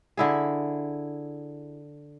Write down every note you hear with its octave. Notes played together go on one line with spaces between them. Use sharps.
D3 E4 G#4